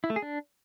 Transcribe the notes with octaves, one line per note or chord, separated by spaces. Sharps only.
E4
A3
G#4
D4